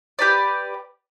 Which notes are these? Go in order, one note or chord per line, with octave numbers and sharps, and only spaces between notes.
G4 B4 D5